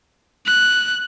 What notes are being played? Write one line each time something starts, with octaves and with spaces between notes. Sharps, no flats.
F#6